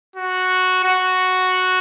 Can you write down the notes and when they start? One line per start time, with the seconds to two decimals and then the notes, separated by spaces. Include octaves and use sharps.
0.16 F#4
0.84 F#4